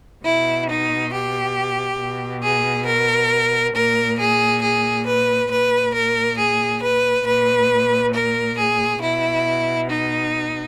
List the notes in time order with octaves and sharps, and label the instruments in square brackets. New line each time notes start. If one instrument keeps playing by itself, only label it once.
[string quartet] B2 E4
D#4
G4
B2
G#4
A#4
A#2 A#4
G#4
G#4
B4
A#2 B4
A#4
G#4
B4
A#2 B4
A#4
G#4
B2 E4
D#4